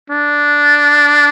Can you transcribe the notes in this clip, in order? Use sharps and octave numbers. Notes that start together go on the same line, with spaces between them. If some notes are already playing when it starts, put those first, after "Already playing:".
D4